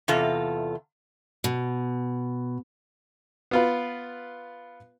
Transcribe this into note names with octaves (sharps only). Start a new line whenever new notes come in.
E2 C3 F4 A4
B2
B3 F4 B4